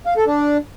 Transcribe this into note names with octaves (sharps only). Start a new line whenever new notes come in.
F5
A4
D4